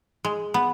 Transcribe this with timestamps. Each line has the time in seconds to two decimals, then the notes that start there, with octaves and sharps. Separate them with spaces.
0.25 G#3
0.54 B3